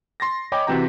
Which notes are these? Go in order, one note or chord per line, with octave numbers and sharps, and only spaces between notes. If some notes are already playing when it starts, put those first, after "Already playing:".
C6 A6 A#6
C#5 D#5 G5 G#5 B5 D6
C3 E3 C4 F#4 G5 A#5